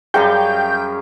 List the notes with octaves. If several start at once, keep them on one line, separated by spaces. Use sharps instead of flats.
F#2 G3 G#4 F5 G5 A#5 C#6 G6